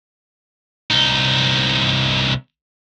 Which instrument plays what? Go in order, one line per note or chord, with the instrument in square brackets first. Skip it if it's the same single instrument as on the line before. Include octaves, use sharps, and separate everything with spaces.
[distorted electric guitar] C2 D#4